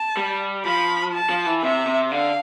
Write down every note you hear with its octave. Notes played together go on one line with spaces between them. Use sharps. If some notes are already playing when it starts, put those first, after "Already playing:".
Already playing: A5
G3
F3 B5
A5
F3
E3
C3 E5
C3
D3 F5